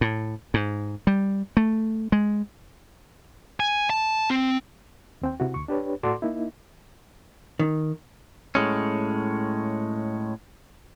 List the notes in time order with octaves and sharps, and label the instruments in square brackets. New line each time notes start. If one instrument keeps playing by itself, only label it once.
[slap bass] A2
G#2
G3
A3
G#3
[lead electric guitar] G#5
A5
C4
[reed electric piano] D#2 C4 G5
C3 E4 F#4
D2 C#6
D4 G4 B4 C#5
A2 F#4 A4 D5 C6 D6
A#3 D#4 E4
[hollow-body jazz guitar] D#3
[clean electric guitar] A2 G#3 C#4